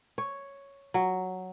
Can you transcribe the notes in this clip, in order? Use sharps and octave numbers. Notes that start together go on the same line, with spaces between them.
C#5
F#3